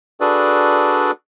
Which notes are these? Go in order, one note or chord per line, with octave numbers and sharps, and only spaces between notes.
D4 F#4 G#4 A4 B4 D5